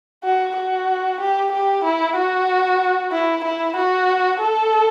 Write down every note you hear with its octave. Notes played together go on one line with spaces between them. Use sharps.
F#4
F#4
G4
G4
E4
F#4
E4
E4
F#4
A4